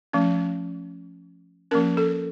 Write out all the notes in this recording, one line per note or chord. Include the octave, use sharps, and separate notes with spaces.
F3 A3 C#4
F3 A#3 C#4 A#4
A4